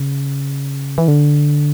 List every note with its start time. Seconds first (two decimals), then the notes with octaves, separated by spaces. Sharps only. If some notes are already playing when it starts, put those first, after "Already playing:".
Already playing: C#3
0.98 E3
1.08 D3